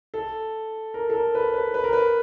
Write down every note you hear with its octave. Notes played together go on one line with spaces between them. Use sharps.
A4
A#4
A4
A#4
B4
B4
B4
A#4
B4